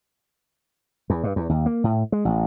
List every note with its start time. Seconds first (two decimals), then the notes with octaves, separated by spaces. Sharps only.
1.10 E2
1.24 G2
1.36 E2
1.49 D#2
1.66 A#3
1.84 A2
2.12 G#3
2.25 A1